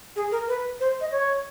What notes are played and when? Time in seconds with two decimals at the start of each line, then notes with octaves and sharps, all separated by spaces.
0.16 G#4
0.31 A#4
0.48 B4
0.80 C5
1.01 D#5
1.11 C#5